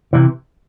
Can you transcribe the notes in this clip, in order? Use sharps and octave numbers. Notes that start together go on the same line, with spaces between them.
C3 E3